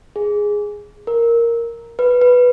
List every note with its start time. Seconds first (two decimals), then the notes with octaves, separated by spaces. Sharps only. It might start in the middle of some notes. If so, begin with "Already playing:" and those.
0.16 G#4
1.07 A#4
1.99 B4
2.22 B4